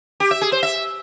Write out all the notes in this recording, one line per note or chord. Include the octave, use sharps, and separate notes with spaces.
G4
E5
G#4
C5
E5